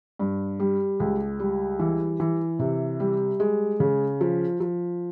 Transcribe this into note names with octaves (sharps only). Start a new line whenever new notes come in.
G2
G3
C#2
G3
E3
E3
C3
G3
G#3
C#3
F3
F3